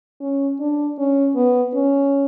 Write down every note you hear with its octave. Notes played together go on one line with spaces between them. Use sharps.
C#4
D4
C#4
B3
C#4